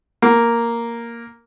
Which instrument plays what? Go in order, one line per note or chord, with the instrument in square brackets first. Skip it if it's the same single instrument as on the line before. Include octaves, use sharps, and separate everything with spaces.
[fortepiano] A#3